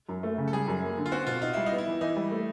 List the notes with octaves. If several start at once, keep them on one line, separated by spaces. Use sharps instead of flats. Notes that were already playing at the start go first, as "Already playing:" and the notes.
F#2
A3
C#3
A4
G3 G#4
F#2
A#3
D3
F4
C4 F#4
B2 F4
D#4 F4
G3 E4
D#4
B3
E4
E3
E3 D#4
G3
A3